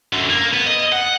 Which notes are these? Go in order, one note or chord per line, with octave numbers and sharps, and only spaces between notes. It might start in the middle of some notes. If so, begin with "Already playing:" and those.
F#2 D3
A#3
B3
D#5
F#5